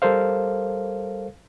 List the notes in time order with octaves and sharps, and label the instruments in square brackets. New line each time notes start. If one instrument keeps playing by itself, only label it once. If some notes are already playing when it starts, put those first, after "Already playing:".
[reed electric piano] G3 A4 A#4 C5 F5